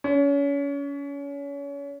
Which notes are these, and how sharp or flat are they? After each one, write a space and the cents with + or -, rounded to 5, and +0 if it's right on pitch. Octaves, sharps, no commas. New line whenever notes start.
C#4 +30